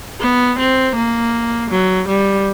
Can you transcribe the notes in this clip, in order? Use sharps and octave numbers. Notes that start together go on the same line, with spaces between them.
B3
C4
A#3
F#3
G3